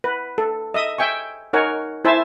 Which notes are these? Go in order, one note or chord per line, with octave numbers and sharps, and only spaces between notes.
B4
A4
D#5 E5 D#6
E5 G5 G#5 C#6
D#4 A#4 C#5 F#5 G#5
E4 C5 E5 G#5 A5